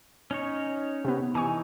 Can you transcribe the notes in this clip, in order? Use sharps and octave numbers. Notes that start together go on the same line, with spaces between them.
C#4 D#4 C#5
C3 B3
E3 D#4 G#5 C#6